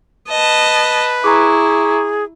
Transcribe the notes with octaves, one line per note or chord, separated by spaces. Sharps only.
B4 D#5 A5
E4 G#4 A#5 C#6 D6